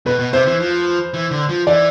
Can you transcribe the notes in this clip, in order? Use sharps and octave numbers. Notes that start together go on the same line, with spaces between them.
B2 B4
B2
C3 C5
E3
F3
E3
D3
F3
E3 D5